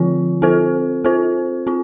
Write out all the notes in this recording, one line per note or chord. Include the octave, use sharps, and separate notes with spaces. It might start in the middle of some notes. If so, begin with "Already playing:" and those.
Already playing: D3 F3 C4 F4
C4 F4 A4 C5
C4 F4 A4 C5
C4 F4